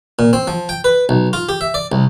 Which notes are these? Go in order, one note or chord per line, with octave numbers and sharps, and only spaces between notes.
A#2
C4
F3
G5
B4
B1
F4
G4
E5
D5
C2